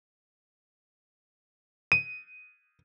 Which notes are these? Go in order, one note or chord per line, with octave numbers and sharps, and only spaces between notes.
D#7